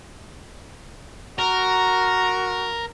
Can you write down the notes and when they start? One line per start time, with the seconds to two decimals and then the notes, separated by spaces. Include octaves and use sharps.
1.39 F#4 A#4